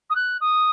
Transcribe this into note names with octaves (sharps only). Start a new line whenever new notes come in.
D#6
F#6
D#6